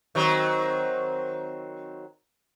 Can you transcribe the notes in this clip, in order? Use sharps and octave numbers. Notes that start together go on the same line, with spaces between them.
D#3 F#3 C4